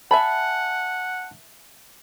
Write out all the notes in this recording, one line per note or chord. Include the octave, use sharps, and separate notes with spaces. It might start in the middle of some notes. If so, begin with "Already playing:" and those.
E5 F#5 G#5 A5 B5